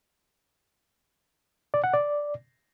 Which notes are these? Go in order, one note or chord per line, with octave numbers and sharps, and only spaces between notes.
D5
F#5
D5